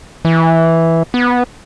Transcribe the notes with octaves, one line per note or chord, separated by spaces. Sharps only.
E3
B3